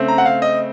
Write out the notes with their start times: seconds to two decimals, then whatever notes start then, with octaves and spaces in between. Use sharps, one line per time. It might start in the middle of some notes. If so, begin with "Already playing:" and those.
Already playing: C#3 A3 C4
0.08 A#5
0.18 F#5
0.26 F5
0.42 D#5